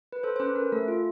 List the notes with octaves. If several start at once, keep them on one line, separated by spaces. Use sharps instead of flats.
B4
A4 C5
C5
C#4 B4
C#4 A#4
A3 A4
F4